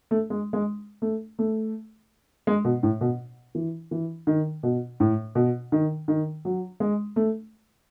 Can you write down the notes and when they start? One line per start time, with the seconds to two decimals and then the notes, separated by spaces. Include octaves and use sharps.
0.11 A3
0.30 G#3
0.53 G#3
1.02 A3
1.39 A3
2.47 G#3
2.65 B2
2.83 A2
3.01 B2
3.55 E3
3.91 E3
4.27 D#3
4.63 B2
5.00 A2
5.35 B2
5.72 D#3
6.08 D#3
6.45 F#3
6.80 G#3
7.16 A3